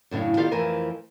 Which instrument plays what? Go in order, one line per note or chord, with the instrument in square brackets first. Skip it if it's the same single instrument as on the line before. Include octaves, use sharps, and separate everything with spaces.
[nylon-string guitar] F#2 A2 C#3 D4
D#3 B3 F4 G4 D5 F5
F2 E3 F3 A3 A#4 G#5